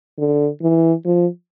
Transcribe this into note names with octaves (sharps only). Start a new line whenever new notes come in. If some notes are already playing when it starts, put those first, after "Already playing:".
D3
E3
F3